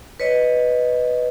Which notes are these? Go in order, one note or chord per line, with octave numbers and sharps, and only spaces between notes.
B4 C#5 D#5